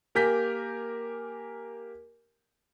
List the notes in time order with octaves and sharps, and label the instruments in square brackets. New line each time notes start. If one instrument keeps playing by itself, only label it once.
[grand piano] A#3 G4 A#4 G#5 G6 B6